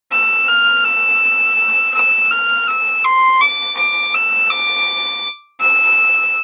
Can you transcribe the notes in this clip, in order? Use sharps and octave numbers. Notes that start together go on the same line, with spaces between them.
E6
F6
E6
E6
F6
E6
C6
D6
D6
E6
D6
E6